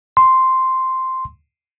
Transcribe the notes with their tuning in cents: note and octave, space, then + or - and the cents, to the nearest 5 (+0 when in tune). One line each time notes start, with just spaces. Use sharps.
C6 -5